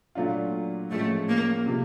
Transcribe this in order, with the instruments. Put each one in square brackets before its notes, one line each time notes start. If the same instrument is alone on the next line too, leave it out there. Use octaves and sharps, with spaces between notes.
[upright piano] A#2 F#3 A3 D4 F4
[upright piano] A2 F3 G#3 C#4 [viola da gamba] A3
[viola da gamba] A#3
[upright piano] C3 F3 A3